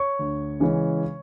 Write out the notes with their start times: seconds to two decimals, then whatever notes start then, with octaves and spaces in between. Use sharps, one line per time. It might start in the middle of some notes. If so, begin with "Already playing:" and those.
Already playing: C#5 C#6
0.19 D2
0.60 C#3 E3 G#3 C#4